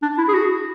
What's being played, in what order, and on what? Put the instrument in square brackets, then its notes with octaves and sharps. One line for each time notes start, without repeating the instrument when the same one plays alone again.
[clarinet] D4
E4
G#4
F#4